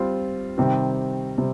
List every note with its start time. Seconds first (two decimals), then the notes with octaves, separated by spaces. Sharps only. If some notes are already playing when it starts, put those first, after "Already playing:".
Already playing: G3 C4 F4
0.58 C3 D#3 G3 C4
1.38 C3 G3 C4